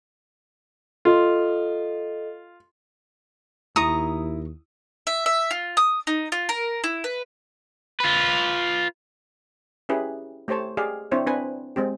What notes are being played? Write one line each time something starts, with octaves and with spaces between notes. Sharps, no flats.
F4 A4 D#5
D#2 E4 A#5 C#6 D#6
E5
E5
F4
D#6
D#4
F4
A#4
E4
B4
F4 B4
C#4 E4 G4 G#4 B4
A3 G4 C5 C#5 A5
G4 G#4 D5 F5
C4 D4 E4 C5 C#5
C4 D4 B4 G#5
G#3 C4 G4